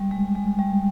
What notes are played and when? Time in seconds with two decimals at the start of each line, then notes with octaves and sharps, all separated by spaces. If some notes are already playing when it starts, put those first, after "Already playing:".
Already playing: G3
0.11 G#3
0.35 G#3
0.59 G3